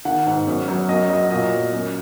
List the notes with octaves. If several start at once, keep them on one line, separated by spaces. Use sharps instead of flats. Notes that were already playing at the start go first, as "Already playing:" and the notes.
D#3 F#5
G#2
F#2
F#3
F#2 D#5
F#3 D#5
A#2 D#5
F#3
F#2